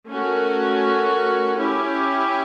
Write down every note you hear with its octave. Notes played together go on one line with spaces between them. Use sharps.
A3 C#4 F#4 A#4
C#4 E4 G4